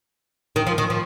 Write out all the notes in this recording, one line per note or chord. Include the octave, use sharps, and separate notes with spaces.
D#3
F3
D#3
F3